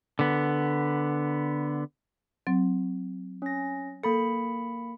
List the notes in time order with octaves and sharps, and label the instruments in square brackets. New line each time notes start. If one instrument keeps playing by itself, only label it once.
[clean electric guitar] D3 B3
[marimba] F#3 C4
[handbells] C#4 A#6
[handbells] A#3 B5 C#7 [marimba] A4